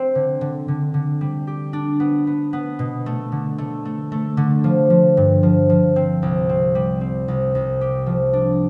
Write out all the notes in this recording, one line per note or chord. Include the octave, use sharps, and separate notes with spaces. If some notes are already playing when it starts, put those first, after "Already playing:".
Already playing: C4
D3
D3
D3
D3
G3
G4
D4
B3
B3
B3
B2
A3
D3
A3
A3
A3
D3
F3
F3
G2
F3
F3
C4
C2
C4
G3
C4
C2
C2
G4
F3
D4